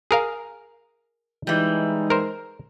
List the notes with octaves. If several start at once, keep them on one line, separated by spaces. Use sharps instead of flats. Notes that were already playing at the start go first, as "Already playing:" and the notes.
G#4 A#4 F5
E3 G3 G#3 D#4
A#4 C5